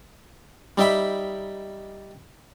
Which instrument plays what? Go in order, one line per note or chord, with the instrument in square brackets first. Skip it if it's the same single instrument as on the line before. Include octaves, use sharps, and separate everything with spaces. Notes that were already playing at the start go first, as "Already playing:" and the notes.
[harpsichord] G3 D#4 E5 G5 B5